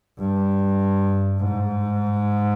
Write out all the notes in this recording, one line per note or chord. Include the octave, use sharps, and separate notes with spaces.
G2
G#2